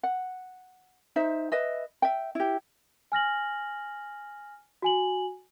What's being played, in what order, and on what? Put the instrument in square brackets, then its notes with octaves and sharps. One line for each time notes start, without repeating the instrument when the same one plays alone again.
[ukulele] F#5
D#4 C5 E5
B4 D#5 E5
E5 G5
E4 G4
[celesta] G#5 F6 A#6 F#7
F#4 G#5 F#7